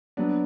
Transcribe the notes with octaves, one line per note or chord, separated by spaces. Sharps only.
F#3 B3 D4